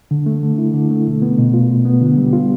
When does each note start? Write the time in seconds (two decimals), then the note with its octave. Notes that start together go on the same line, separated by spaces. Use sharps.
0.11 D3
0.26 A3
0.43 D3
0.58 E4
0.74 D3
0.91 A3
1.07 B2
1.22 B3
1.38 B2
1.54 F4
1.70 B2
1.85 B3
2.01 D3
2.18 G3
2.33 F4